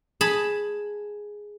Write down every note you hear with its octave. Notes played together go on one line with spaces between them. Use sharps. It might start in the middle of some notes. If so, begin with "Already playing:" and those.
G#4 A5 B5